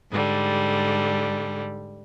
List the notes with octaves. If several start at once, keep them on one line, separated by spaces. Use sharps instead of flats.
G#2 D3 G3